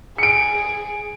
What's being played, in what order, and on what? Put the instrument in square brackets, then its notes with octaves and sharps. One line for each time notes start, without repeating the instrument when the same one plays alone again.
[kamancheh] G#4 [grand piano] C#7 D7